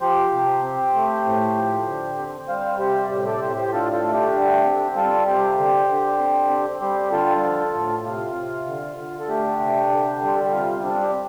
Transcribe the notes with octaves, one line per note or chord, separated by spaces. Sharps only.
F3 G4 C5
C3
C4
A3
A2
F3
D3
C4
G3 C5 F5
C3 G4 C5
D5
A2 G4 C5
A4 D5
A2 G4 C5
G4 C5
D3 F4 A4
F4 A4
A3
D4 G4
D3
C4
G3 F4 A4
C3 G4 C5
D3
D3
C4
C4
G3 G4 C5
D3 F4 A4
F3
A2
C3 F4
C3
D3
D3
A4
A3 D4 G4
C3
D3
G3
C5
A4
G4
C3 F4
C4 D4
G4